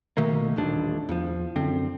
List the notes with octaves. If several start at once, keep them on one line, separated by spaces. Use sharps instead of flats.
B2 D#3 A3 A#3
D#1 A1 D#2 D4
E2 F3
F#2 D3 C4